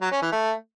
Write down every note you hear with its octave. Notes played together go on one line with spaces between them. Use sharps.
F#3
C#4
E3
A3